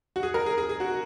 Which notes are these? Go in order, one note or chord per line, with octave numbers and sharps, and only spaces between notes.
F#4
G#4
A#4
G#4
G#4
G#4
F#4